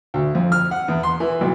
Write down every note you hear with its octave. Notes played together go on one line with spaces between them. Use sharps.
D2
F2
F6
F#5
E2
C6
E3
B1